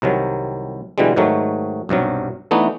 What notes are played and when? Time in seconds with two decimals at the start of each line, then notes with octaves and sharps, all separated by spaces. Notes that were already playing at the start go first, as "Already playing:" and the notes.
0.02 C2 C3 D#3 F#3
0.98 B2 D3 E3 G3 G#3
1.16 G#2 D#3 F#3 A3
1.89 B1 G2 C3 F#3
2.51 E3 A3 B3 D4 D#4